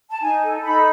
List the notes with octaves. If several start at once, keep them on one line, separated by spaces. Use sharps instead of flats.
A5
D#4 G#5
A4
D#4 B5